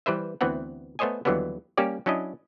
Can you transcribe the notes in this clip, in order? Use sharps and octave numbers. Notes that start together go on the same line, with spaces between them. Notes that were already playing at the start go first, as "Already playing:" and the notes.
E3 G3 B4 C5 E5
D2 E3 B3 C4 F#5
A3 B3 C5 C#5 D#5 G#5
D#2 D3 E3 F#3 G3 B3
G3 A#3 C#4 G4 C#5 D5
F#3 C#4 D4 E4 D#5